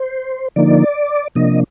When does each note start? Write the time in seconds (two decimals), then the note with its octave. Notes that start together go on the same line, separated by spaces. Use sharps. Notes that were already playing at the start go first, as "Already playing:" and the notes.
Already playing: C5
0.56 D3 F3 A#3 D#4 D5
1.35 C3 F3 A#3 D4 D#5